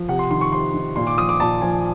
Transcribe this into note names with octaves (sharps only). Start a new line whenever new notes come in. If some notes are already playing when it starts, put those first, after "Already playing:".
Already playing: F3
C3 F#5
C6
D#3 C6
C#6
C3 C6
D#3
A#2 C6
D6
F3 D#6
D6
A#2 A5
F3 G#5